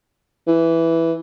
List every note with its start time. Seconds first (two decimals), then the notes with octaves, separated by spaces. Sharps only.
0.47 E3